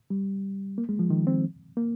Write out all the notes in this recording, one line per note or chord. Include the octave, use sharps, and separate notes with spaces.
G3
A#3
G#3
F3
D#3
C4
A#3